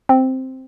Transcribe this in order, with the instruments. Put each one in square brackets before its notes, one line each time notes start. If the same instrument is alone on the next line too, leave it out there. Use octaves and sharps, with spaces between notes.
[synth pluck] C4